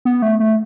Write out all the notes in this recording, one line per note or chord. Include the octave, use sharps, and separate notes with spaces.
B3
A3
A3